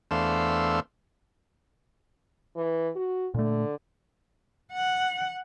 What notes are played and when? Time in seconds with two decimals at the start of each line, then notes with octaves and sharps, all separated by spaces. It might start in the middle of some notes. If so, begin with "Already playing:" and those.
0.11 E2 A3 D4 C5 F5 E6
2.56 E3
2.95 F#4
3.34 A#2 D3 A3
4.73 F#5